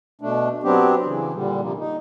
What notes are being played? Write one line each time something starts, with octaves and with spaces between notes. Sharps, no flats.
B2 A3 D4
F#3 B3 C4 D4 G4
C#3 E3
A#2 D3 G3
C3 F3 A#3
D#4